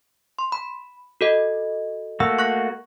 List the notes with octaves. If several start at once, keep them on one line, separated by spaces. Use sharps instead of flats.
C6
B5
F#4 A4 D#5
A3 A#3 F#4 E6
C#6 F#6 A#6